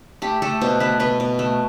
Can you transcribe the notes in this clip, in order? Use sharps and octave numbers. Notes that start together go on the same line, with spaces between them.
A3 G4
A3 A4
B2 C5
A3 B4
B2 B4
B2
A3